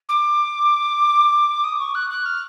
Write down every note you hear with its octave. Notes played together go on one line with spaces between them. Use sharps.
D6
D#6
C#6
F#6
F#6
F6